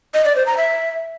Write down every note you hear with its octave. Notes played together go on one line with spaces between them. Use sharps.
D#5
D5
C5
A#5
E5